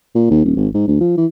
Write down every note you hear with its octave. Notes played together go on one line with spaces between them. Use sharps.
A#2
D#2
D#1
G#1
G#2
D2
F3
E3